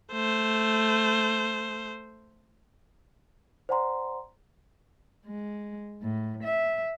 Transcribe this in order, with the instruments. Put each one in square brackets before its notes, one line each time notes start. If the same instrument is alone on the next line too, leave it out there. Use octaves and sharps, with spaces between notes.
[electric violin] A3 C5
[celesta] C5 D5 F#5 G#5 A#5 C6
[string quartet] G#3
A2
E5